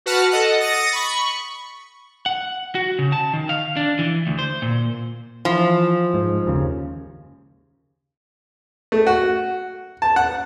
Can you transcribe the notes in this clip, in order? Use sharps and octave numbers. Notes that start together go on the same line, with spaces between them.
F#4 B4 F#5 A5 F6
A4 D#5 F#5
D#6 A6 A#6 C#7 D#7
B5 C#6
F#5
F#4
C#3
A5
D#3
F5
D4
E3
D2
C5
A#2
E3 F3
G#2
F#1 D#2 C#3
A3
F#4
A5
F#5